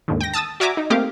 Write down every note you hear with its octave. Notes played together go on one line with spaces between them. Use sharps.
D#2 G#2 D3 D#3
G5 A#6
A5 D#6 E6 A6
F#4 D5 E5 G#5 A#5 D6
D#4
A3 A#3 C4 G4 F5 D6